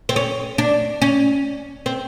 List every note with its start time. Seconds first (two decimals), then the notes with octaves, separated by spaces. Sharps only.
0.09 C4
0.16 C#4
0.58 D4
1.02 C#4
1.86 C4